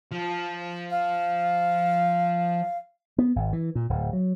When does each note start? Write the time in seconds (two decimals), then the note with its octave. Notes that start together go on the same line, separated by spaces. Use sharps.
0.12 F3
0.91 F5
3.18 B3
3.36 G#1
3.53 E3
3.75 A#2
3.89 D1
4.13 F#3